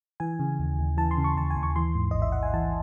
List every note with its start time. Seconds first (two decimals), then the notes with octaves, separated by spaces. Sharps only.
0.20 E3 G#5
0.39 C#3
0.59 D#2
0.79 D#2
0.97 E3 A5
1.11 C6
1.17 C#3
1.24 C#6
1.36 D#2 A5
1.50 G#5
1.56 D#2
1.63 C#6
1.76 E3 C6
1.95 G#2
2.11 A1 D#5
2.22 E5
2.32 A1 F#5
2.43 G#5
2.53 E3 A5